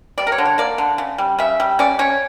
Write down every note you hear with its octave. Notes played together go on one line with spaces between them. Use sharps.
G3 D5
A#4
C#5
D3
C#5
A#3 D5
D3
C#3
G3
C#3 E5
G3
C#4 D5
C#4 C#5